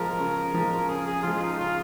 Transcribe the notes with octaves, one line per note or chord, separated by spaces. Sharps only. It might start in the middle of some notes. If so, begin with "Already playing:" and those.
Already playing: F3 G#3 A#4
C#3
F3 G#3
C#3 G#4
G#4
F3 G#3 F4
D#4
D#4
C#3 F4